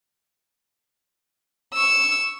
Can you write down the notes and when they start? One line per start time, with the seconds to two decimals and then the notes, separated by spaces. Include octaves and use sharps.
1.74 C#6 E6